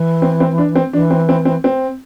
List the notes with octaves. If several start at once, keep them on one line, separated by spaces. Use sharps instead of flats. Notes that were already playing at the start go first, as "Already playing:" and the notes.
Already playing: E3
C4
C4
D4
C4
E3 D4
C4
C4
C4
C4